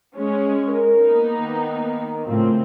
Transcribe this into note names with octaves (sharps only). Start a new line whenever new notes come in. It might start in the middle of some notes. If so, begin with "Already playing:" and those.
G#3 C#4
A#4
A#3 B3 D#4
D#3
A2 C#3 F3 A#3 C4 F4